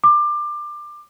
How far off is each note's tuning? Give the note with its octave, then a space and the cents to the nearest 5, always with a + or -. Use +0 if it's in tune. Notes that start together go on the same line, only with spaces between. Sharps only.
D6 +25